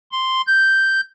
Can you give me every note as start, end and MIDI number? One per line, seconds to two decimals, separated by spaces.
0.12 0.41 84
0.47 1.01 91